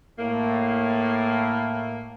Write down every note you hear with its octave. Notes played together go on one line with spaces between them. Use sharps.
A2 A#3